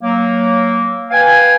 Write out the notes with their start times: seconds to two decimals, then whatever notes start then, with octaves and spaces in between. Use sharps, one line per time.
0.02 F#3 A#3
1.11 B4 F5 G5 G#5